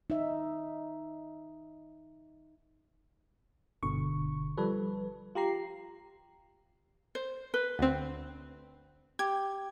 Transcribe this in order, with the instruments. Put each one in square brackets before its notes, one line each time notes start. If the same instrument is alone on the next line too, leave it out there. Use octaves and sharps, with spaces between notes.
[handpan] D#4 E5
[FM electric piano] G1 B2 D3 C#6
F3 G3 A4 B4
F4 G4 A#5 C7
[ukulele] C5
B4
[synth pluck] D2 C4
[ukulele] G4 [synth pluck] G#6